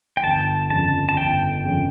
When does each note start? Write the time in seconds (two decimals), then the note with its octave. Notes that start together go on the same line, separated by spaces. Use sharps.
0.17 G5
0.23 G1 A5
0.70 F2 C#3 A5
1.09 A5
1.17 G1 G5
1.64 F2 C#3